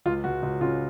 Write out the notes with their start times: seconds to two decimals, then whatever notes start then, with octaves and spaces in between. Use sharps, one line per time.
0.06 C#2 F4
0.24 C#2 F#4
0.43 C#2
0.61 C#3 F4